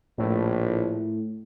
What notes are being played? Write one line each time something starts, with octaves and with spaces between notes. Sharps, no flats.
A#1 A2